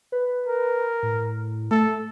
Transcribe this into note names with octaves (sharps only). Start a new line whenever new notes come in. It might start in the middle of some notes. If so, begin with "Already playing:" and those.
B4
A#4
A2
A3 A4